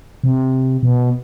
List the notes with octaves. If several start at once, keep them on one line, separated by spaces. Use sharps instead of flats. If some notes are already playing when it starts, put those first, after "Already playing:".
C3
B2